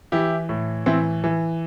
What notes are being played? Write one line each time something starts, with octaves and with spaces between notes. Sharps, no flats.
E3 E4 G4
A2
E3 C4 E4
E3